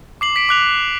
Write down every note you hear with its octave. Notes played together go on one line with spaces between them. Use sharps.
D6 C7 F#7
B6 D7
D6 F#6 F7